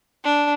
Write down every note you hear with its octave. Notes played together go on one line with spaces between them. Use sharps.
D4